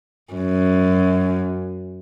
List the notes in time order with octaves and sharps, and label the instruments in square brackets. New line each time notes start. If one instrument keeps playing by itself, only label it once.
[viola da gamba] F#2